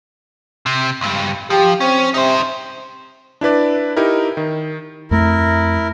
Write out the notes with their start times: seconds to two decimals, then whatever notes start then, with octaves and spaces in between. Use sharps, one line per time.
0.66 C3
1.01 C#2 G2
1.50 F3 G4
1.80 C4 C#4
2.14 C3 D#4 C5
3.41 D4 E4 B4 D5
3.97 D#4 E4 G4 A#4
4.37 D#3
5.11 F2 A3 E4 A#4